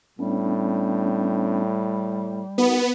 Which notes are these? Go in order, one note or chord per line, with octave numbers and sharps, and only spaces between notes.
A2 G3 B3 C#4 D4
B3 D#4 F#4 A#4